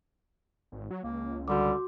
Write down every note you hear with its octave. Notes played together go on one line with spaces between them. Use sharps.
G#1
F#3
C#2 A#3
D3 G3 F#4 C6 D6